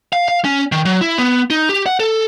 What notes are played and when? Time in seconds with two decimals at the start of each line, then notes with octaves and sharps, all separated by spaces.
0.13 F5
0.28 F5
0.45 C#4
0.72 D#3
0.85 F#3
1.01 E4
1.18 B3
1.50 D#4
1.69 G4
1.86 F#5
2.00 A4